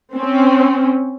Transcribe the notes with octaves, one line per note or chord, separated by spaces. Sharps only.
C4 C#4